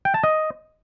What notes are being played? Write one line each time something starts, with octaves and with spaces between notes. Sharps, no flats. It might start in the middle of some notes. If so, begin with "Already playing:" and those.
G5
A5
D#5